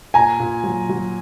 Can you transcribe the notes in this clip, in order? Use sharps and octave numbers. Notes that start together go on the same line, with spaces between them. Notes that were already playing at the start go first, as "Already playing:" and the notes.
A#2 G#5 A#5
A#2
F#3
F#3